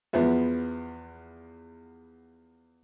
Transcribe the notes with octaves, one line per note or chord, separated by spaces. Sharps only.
E2 F3 B3 E5